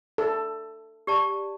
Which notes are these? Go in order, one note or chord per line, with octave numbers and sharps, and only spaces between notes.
A4
G4 D5 A5